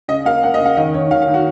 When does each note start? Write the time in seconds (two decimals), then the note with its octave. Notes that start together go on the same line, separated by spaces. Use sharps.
0.08 C#3 D#5
0.25 A#3 F5
0.43 A#3 F#5
0.54 D#5
0.60 C#3
0.66 F5
0.77 D#3 D#5
0.94 D#3 C#5
1.11 D#3 F5
1.22 F5
1.28 D#3
1.34 F#4